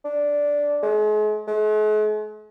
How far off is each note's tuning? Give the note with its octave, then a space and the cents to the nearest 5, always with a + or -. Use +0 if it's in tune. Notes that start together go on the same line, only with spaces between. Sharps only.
D4 -10
G#3 +40
G#3 +45